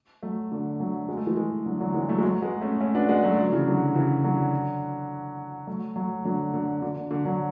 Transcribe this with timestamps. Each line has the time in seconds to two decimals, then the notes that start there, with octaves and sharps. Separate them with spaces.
0.23 F#3 A3
0.52 D3
0.80 D3 F#3
1.09 G#3
1.17 A3
1.27 E3 G#3
1.37 E3 G#3
1.66 D3 F#3
1.80 D3 F#3
1.94 E3 G#3
2.09 F#3 A3
2.18 G#3
2.23 F#3 A3
2.42 G#3 B3
2.61 A3 C#4
2.81 A3 C#4
2.95 B3 D4
3.09 G#3 B3
3.23 F#3 A3
3.38 D3 F#3
3.52 C#3 E3
3.67 D3 F#3
3.95 C#3 E3
4.24 D3 F#3
5.67 F#3 A3
5.96 F#3 A3
6.25 D3 F#3
6.54 D3
6.82 D3
6.96 D3
7.11 D3
7.25 D3 F#3